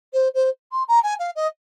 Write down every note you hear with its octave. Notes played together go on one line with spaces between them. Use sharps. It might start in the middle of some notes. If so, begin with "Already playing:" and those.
C5
C5
C6
A#5
G#5
F5
D#5